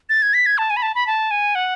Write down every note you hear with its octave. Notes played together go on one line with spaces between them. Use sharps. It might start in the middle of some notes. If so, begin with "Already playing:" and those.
A6
G#6
B6
G#6
A5
G#5
B5
A5
B5
A5
G#5
F#5